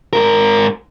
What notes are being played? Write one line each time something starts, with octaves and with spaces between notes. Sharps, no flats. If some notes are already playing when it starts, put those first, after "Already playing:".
G#2 A#4